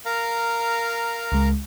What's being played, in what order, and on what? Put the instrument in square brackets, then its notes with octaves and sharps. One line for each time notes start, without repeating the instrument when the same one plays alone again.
[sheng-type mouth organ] A#4 F5 A#5
[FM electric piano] C#2 G#3